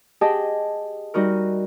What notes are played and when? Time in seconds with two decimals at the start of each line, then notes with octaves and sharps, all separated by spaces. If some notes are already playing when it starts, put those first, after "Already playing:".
0.21 G4 G#4 D#5 G5 A5
1.14 G3 D#4 F#4 A#4